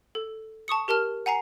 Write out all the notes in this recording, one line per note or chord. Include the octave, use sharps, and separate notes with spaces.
A4
A5 C#6 D#6 C#7
G4 A#4 A5 F6
F#5 G#5 A#5 C7